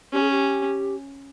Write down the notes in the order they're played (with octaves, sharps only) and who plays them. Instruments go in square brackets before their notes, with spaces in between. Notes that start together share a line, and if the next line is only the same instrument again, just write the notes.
[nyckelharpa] C#4 [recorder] G4
[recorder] G#4
G4